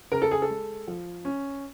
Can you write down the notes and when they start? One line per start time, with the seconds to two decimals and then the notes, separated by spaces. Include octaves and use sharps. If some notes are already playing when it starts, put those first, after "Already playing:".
0.12 C#3 A#4
0.22 A4
0.31 G#4
0.42 A4
0.50 G#3
0.87 F3
1.25 C#4